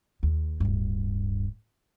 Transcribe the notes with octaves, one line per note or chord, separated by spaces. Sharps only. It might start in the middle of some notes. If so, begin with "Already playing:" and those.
D#2
D1 G2